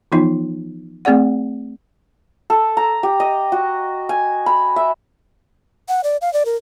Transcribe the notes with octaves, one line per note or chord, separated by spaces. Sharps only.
E3 F3 B3 D#4 F4
A3 C4 G#4 D5 F#5
A4
A#5
G4
D#5
F#4
G#5
B5
E5
F#5
D5
F5
D5
A#4